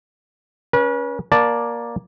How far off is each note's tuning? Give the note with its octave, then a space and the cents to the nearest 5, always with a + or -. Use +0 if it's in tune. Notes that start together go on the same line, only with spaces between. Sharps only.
C#4 +15 B4 -40
A#3 +15 D5 +0 A5 +0